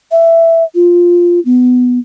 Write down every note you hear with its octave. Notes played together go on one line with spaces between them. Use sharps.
E5
F4
B3